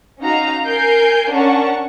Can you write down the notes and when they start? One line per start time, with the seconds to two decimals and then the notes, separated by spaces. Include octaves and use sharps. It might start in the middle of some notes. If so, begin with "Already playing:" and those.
0.19 C#4 D#4 F#4 D#5 F5 A#5
0.66 A#4 G#5 G6 C7 D7
1.30 C#4 D4 A#4 F#5 A5 C#6